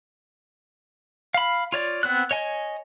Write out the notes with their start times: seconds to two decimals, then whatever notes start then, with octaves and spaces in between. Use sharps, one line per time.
1.34 F5 B5
1.72 F4 C#5 D5
2.03 B3 C4 F#6
2.31 C#5 D#5 G#5